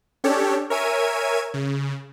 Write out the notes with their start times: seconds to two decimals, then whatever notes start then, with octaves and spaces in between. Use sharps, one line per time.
0.24 C#4 D4 G4 A4 C#5
0.70 A#4 C#5 E5 G#5 G#6 D#7
1.54 C#3